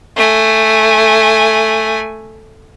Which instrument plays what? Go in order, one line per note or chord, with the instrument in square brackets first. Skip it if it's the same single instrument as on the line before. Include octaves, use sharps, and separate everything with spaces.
[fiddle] A3 G#5